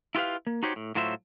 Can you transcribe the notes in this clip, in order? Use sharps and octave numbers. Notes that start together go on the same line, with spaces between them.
E4 F4 G4 B4 F5
A#3
D#4 F#4 G4 C5 C#5
A2
A2 F#3 F4 C5 E5